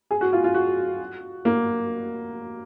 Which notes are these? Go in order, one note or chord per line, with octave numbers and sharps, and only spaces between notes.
G#4
F#4
F4
F4
F#4
A#3